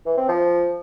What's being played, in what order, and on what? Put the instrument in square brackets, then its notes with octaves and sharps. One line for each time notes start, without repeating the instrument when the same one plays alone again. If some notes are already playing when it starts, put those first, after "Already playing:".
[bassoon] E3
C4
F3